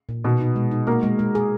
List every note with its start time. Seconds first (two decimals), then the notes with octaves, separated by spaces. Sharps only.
0.09 A#2
0.24 B2 B3 D#4
0.41 D#4
0.56 G#3
0.71 D#4
0.87 A#3 F#4 A#4
1.03 G#3
1.19 G#3
1.35 G#4